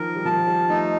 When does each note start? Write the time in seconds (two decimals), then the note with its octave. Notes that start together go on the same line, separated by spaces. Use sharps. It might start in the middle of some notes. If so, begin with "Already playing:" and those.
Already playing: D#3 F3 A#4
0.16 G3
0.25 F3 A5
0.47 G3
0.69 A3 D#4